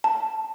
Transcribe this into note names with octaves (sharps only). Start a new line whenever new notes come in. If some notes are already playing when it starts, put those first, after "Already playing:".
A5